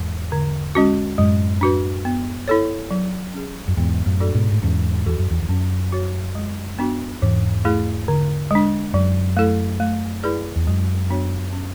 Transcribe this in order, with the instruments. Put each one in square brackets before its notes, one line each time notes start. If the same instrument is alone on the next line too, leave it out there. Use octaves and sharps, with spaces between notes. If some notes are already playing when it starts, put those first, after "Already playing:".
Already playing: [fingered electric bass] E2 G#2
[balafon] D3
G#3 C#4 F#4
[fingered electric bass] F#2 A2 [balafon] G#3
[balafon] D4 F#4 B4
B3
E4 A4 C#5
F#3
C#4 G#4
[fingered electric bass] F#2
[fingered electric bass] E2 G#2 [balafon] B3
[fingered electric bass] F#2 A2
[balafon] D4 F#4 A4 D5
[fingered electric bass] G#2 B2
A2
[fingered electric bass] E2 G#2 [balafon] C#4
[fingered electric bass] E2 [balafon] F#4 A4
[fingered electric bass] F#2
E2
E2
[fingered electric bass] F#2 [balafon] C#4
[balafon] F#4 C#5
G#3
B3 D4 F#4
[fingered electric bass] E2 G#2 [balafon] E3
[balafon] A3 E4 G#4
D3
G#3 D4
[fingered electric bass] F#2 [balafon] F#3
[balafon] A3 E4 A4
A3
E4 G#4 B4 D5
[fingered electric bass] E2
[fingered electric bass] F#2 [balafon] G#3
[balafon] B3 D4 F#4 C#5
C#4